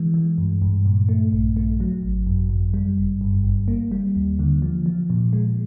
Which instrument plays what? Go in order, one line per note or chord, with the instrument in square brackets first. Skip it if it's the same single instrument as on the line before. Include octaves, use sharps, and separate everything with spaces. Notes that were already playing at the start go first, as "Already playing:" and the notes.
Already playing: [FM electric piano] E3 G#3
E3
G2
G2
A#2
A3
A#1
A3
F#3
G#1
F#2
F#2
G3
G1
G2
G1
A#3
G3
D#2
D3
F3
F3
A#2
G#3